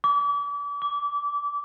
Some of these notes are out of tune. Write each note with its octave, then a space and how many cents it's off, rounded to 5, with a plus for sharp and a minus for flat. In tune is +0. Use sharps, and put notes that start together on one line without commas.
D6 -35
D6 -20